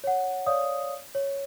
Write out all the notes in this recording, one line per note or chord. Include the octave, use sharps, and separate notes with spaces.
C#5 F#5
C#5 D5 F5 D#6
C#5